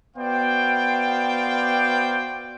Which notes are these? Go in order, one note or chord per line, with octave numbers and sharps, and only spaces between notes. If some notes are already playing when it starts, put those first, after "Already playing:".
B3 F#4 C5 D5 F5 G5